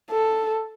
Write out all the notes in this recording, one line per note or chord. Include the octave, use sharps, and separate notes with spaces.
A4